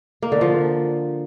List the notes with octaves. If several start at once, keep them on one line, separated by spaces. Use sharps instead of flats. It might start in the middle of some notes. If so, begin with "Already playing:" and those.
A#3
D3
F3